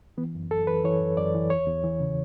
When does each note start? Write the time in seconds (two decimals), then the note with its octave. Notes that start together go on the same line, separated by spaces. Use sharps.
0.17 E3 B3
0.35 F#2
0.51 F#2 A4
0.67 E3 B4
0.84 E3 C#5
1.00 F#2
1.17 F#2 D5
1.35 E3
1.50 E2 C#5
1.67 E2
1.84 E3
2.00 C#3